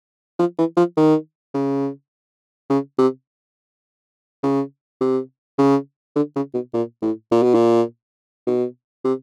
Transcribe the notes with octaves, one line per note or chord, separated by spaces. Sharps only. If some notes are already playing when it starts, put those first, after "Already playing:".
F3
E3
F3
D#3
C#3
C#3
C3
C#3
C3
C#3
D3
C#3
B2
A#2
A2
A#2
B2
A#2
B2
C3